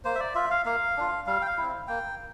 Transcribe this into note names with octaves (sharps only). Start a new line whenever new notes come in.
A#3 C5
E5
D5
F4 E5
F5
A#3 F5
D4 F4
G3 F5
G5
F5
C4 E4
A#3 G5